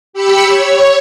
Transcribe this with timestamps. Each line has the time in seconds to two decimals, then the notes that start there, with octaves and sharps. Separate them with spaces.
0.13 G4 B5 E6 C#7
0.45 C#5